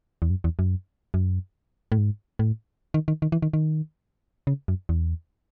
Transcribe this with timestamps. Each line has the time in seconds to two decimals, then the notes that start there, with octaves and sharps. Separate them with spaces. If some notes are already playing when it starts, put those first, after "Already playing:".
0.22 E2
0.30 F#2
0.44 E2
0.59 F#2
1.14 F#2
1.92 A2
1.98 G#2
2.39 A2
2.94 D#3
3.08 D#3
3.22 D#3
3.32 E3
3.42 D#3
3.53 D#3
4.47 C#3
4.68 F#2
4.89 E2